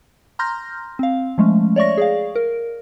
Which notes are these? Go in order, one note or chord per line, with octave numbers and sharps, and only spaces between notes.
A#5 C6 F6 G6 A#6
C4 F5
F3 G#3 A3 C#4
C#5 D5 E5 C#6 A#6
G#4 D5 F5
A#4